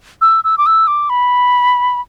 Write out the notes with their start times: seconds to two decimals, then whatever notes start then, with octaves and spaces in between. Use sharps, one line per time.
0.21 E6
0.44 E6
0.58 D6
0.66 E6
0.87 D6
1.10 B5